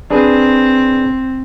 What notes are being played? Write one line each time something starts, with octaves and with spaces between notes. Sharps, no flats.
C4 D4 G#4 B4